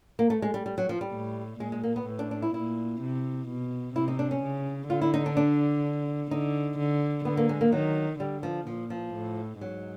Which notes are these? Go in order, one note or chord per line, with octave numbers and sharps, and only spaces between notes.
A#3
A3
G#3
G3
G3
F#3
F3
G3
A2
A#2 G#3
G#3
A#3
B3
A2
D4
D4
E4
A#2 E4
C3
B2
C3 E4
D#4
D4
C#4
C#3
D3 F4
E4
D#4
D4
D4
D3 D#4
D3
D3 B3
A#3
G#3
A#3
D#3 F#3
D3 G3
F3
A#2 F3
F3
A2
G#2 F#3